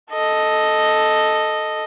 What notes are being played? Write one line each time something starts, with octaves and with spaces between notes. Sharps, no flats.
A4 D#5